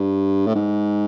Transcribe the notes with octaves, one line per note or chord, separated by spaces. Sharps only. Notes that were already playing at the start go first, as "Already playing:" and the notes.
Already playing: G2
A2
G#2